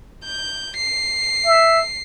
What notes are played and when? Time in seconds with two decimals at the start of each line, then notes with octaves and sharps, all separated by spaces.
0.25 G6
0.77 C7
1.45 E5